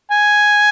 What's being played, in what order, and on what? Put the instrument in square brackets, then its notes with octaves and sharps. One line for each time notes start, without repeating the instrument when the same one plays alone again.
[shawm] G#5